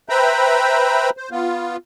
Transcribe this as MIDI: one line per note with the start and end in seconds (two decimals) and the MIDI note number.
0.09 1.10 71
0.09 1.10 72
0.09 1.10 76
0.09 1.10 79
0.09 1.10 82
0.09 1.10 83
1.17 1.29 72
1.31 1.76 59
1.31 1.76 65